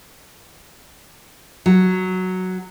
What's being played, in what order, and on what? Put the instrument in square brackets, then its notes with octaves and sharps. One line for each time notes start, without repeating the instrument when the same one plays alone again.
[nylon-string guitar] F#3